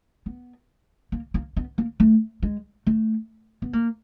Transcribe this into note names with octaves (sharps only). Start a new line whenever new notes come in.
B3
A#3
A#3
B3
A#3
A3
G#3
A3
B3
A#3